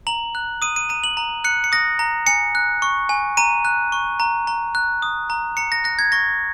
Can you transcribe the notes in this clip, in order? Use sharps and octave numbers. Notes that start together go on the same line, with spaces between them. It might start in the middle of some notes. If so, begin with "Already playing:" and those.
A#5 F#7
F#6
D#6 D#7
D#7
A#5 D#7
F#7
A#5
F#6 C#7
C#7
D#6 A#6
A#5
G#5 C#7
F#6
C#6
G#5
A#5 D#7
F#6
C#6
A#5
A#5
F#6
D#6
A#5
A#5 C#7
A#6
F#6 A#6
G#6
C#6 A#6